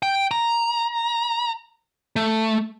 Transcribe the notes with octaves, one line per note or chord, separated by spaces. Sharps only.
G5
A#5
A3